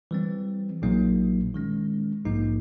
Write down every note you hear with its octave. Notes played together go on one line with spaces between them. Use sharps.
E3 G3 C4
A#1 A#2 F#3 A#3 D#4
D#3 G#3 C#4
A#1 G#2 F3 A#3 D#4